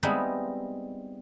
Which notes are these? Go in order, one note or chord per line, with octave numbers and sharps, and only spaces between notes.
G3 G#3 B3 C4 D#4 E4